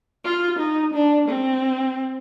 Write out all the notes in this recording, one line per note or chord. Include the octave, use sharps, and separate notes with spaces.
F4
D#4
D4
C4